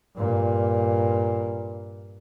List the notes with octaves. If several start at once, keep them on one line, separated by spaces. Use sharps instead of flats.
G2 A#2